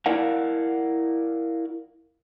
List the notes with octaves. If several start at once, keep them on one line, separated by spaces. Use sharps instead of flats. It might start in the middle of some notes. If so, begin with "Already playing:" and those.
E4 A#4 D5 F5 F#5